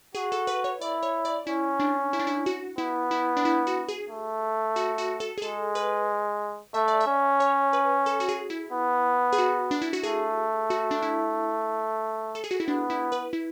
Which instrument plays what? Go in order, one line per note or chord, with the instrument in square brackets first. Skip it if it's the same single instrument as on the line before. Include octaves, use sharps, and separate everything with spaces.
[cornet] F#4 [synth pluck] G#4
[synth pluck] A4
B4
C#5
[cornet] E4 [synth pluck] D5
[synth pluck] C#5
D5
[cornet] C#4 [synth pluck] E4
[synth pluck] D4
E4
D4
E4
F#4
[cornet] B3 [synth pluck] E4
[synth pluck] E4
D4
E4
F#4
G#4
[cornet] A3
[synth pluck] F#4
F#4
A4
G#4
[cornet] G#3 [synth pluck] A4
[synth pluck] B4
[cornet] A3 [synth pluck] E5
[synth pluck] D5
E5
[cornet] C#4
[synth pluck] C#5
B4
A4
F#4
G#4
E4
[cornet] B3
[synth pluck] G#4
F#4
D4
E4
F#4
[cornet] A3 [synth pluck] G#4
[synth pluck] F#4
D4
E4
A4
G#4
F#4
E4
[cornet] B3 [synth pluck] D4
[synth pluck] E4
B4
E4